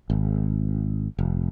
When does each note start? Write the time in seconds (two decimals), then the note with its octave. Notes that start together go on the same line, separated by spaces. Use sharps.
0.10 G#1
1.19 F1